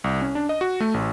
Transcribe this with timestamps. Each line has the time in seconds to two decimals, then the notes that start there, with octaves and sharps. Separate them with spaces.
0.04 C2
0.22 C#4
0.35 D4
0.49 D#5
0.61 F#4
0.80 A3
0.94 A1